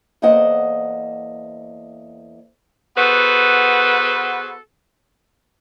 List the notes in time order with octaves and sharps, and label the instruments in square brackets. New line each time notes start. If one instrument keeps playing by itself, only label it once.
[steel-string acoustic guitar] E2 A#3 A4 C5 D#5 F#5
[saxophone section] B3 F#4 G#4 A4 B4 C5